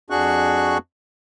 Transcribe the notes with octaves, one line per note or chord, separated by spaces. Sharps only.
F2 D4 F#4 G#4 C#6 F#6